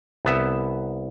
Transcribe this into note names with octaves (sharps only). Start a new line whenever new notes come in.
C2 B3 E5